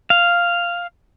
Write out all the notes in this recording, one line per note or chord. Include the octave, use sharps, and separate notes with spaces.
F5